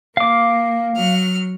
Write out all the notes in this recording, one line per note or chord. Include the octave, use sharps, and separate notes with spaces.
A#3 F5 D6
F#3 F6